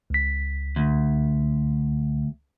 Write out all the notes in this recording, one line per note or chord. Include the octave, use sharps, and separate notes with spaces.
C#2 B6
D2